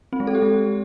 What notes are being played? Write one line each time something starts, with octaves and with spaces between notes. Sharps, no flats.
C4
G#3
A4
G4
G#3